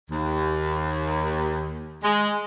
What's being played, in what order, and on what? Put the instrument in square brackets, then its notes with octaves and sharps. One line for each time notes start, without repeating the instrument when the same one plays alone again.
[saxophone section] D#2
G#3